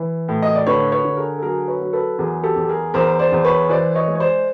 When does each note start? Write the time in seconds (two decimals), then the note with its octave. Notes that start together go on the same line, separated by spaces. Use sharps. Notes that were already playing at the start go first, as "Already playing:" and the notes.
Already playing: E3
0.29 A2
0.43 D#5
0.55 D5
0.67 D3 B4 C#5
0.92 B4 C#5
1.05 D3
1.17 G#4 A#4
1.38 A4
1.42 F#3 G#4 A#4
1.68 B4 C#5
1.80 F#3
1.93 A4 B4
2.18 E2 G#4 A#4
2.43 G4 A4
2.56 E2
2.69 G#4 A#4
2.94 E2 A#4 C5
3.19 C5 D5
3.32 E2
3.44 B4 C#5
3.69 E3 C5 D5
3.95 C#5 D#5
4.08 G#3
4.15 C#5
4.20 C5 D5